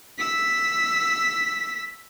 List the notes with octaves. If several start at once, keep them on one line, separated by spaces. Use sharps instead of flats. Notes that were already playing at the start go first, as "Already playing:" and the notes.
E6 B6